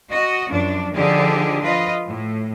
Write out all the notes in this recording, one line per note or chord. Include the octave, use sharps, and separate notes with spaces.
F#4 D#5
F#2 F3 D4
D3 F3 D4 D#4 G4 G#4
F3 F4 B4 D#5
A2